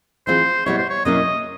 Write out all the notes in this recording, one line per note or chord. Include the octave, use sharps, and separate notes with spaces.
E3 G#3 C4 F4 C5
B2 G3 B3 E4 C#5
C5
C#5
B2 F#3 A#3 C#4 E4 D#5